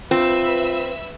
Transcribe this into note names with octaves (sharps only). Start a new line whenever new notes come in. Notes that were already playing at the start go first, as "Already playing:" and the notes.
C4 F4 B4 E5 E6